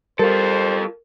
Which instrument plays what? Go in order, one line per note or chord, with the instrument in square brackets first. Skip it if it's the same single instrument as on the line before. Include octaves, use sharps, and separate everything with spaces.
[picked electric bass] G3 [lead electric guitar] F4 A4 [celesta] A#4 [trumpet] C5